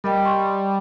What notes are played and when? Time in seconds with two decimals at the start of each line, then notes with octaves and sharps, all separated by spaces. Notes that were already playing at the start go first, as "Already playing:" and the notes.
0.04 G3 A#4 D#5 G5
0.25 C6 C#6